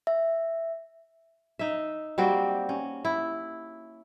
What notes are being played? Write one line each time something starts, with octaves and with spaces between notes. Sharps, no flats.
E5
D#4 E5
G3 A#3 C4 F#4
C#4
E4